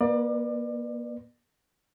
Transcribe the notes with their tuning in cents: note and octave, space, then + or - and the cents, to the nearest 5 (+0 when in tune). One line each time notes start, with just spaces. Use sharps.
A#3 +35 B4 +0 D5 +30